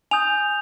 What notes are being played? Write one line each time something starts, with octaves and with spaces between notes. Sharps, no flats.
G#5 D#6 G6 F7